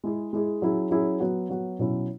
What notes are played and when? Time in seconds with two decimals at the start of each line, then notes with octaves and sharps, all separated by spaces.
0.04 G#3 E4 G#4
0.33 G#3 E4 G#4
0.62 F#3 C#4 E4 G#4
0.91 F#3 C#4 E4 G#4
1.20 F#3 B3 F#4
1.49 F#3 B3 F#4
1.79 B2 F#3 C#4 E4